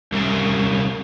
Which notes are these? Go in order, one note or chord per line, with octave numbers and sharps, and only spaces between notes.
C2 C#3